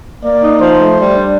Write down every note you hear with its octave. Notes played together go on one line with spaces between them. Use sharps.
A#3 D5
D#4
F3 C5
A3
G3
D4